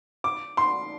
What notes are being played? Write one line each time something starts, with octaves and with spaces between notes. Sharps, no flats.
D6
C6